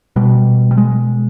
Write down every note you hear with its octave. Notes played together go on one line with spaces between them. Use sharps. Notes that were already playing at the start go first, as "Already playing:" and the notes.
B2 G3
G3
G#3